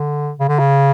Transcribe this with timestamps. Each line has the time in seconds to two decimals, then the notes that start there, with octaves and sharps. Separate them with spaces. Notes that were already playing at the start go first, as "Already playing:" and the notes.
Already playing: D3
0.40 C#3
0.49 D3
0.59 C#3